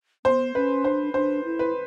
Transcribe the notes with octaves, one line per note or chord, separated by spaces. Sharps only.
B3 C5
C#4 B4
D4 C5
D4 C5
E4
B4